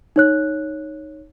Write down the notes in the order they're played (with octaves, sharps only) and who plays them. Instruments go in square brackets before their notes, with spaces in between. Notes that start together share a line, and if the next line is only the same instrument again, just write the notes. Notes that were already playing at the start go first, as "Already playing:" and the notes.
[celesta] D#4 C#5 F#6